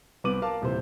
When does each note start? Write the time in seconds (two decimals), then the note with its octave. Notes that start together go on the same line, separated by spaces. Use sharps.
0.24 C2 B3 C4 D6 D#7 F#7
0.42 A#4 F5 A5 D6
0.62 D#1 C3 E3 C5